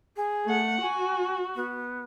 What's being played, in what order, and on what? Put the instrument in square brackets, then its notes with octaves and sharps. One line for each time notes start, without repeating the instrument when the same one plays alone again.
[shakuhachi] G#4
[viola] A3 F#5
[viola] F#4 [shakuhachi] G#5
[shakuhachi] B3